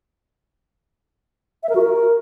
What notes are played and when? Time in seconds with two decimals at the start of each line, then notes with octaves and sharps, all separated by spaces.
1.63 E5
1.69 A#4
1.75 F#4
1.82 A#4